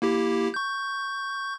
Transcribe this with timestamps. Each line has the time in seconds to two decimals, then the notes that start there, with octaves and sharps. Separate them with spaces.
0.02 A#3 E4 G4
0.54 C#6 G6